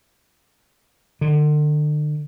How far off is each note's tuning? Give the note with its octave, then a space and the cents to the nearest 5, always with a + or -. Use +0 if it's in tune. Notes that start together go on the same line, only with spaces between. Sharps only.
D3 +35